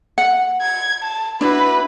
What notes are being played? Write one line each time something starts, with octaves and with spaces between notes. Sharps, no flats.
F#5
G#6
A5
D4 E4 F#4 B4